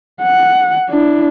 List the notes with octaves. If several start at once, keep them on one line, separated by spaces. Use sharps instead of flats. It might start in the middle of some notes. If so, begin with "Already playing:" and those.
F#5
D4 E4